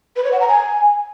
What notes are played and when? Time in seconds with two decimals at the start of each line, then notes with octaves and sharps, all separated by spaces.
0.16 B4
0.24 C#5
0.32 F#5
0.40 A#5
0.48 G#5